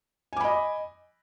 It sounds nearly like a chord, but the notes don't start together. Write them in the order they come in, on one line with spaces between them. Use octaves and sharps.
G#5 D6 B5 D#5